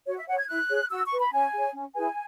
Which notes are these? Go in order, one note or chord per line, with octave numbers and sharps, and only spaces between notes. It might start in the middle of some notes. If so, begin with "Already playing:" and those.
F#4 C#5
E5
C#5 F#5
G#6
E4 F#6
G#4 C#5
F#4 E6
C#6
B4
B5
C#4 G#5
G#4 C#5
C#4
E4 G#4 B4 G#5